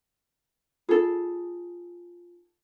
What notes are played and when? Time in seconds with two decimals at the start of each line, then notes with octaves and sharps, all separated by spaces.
0.89 D#4 F4 G#4 A4